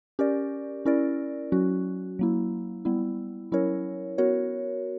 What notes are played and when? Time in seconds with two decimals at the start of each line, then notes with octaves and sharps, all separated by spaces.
0.19 C#4 G4 A#4 D5
0.85 C#4 E4 A#4 D5
1.52 F#3 C#4 F#4
2.19 F#3 A#3 E4
2.85 G3 B3 E4
3.52 F#3 C#4 E4 A#4 C#5
4.18 B3 F#4 A#4 C#5